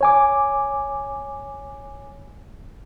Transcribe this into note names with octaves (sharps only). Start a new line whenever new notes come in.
C#5 G#5 D6